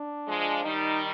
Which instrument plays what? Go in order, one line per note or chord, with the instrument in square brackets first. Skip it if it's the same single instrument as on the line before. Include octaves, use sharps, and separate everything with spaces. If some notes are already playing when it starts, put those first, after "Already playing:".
Already playing: [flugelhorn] D4
[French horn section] F3 G#3
[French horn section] D#3 G3 [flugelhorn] D#4